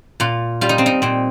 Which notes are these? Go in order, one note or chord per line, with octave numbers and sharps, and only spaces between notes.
A#2 F4
G3 F4
D#4
C4
D#4
A#2 C4